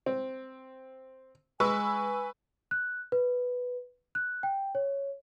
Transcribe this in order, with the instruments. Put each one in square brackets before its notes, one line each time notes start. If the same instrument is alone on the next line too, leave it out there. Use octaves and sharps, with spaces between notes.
[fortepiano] C4
[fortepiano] G#3 [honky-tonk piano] B4 C#6 E6 [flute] G#5
[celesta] F#6
B4
F#6
G5
C#5